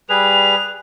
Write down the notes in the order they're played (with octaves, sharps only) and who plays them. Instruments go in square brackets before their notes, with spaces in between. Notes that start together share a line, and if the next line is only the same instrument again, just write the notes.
[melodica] G3 G#4 B4 [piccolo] F7